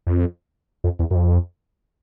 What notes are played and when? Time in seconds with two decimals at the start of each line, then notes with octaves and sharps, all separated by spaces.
0.07 F2
0.84 F2
0.99 E2
1.11 F#2
1.15 F2